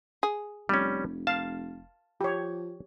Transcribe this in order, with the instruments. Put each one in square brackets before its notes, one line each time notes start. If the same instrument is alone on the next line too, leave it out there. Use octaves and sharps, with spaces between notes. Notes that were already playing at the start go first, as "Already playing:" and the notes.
[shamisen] G#4
[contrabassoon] F1 [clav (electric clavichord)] G3 C#4
[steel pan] F5 [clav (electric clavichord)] A5
[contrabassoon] F3 [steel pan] G4 C#5